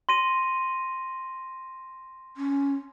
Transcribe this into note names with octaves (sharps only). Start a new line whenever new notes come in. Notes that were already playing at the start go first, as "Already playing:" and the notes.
C6 A#6 D#7
C#4